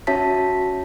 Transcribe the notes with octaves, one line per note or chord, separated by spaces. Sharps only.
C#4 F#4 C#5 E5 A5 B6